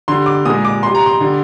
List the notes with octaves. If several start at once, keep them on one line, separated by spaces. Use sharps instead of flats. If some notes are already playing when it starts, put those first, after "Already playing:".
D3 G3 C6
D6
A#2 G#3 D#6
D6
C3 G3 C6
A#5
C6
D3 G3